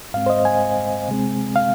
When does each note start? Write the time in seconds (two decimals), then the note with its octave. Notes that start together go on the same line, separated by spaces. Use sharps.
0.14 G#2 G#3 C4 F5
0.26 C5
0.30 D#5
0.45 G#5
1.08 C3 G#3 C4
1.56 F5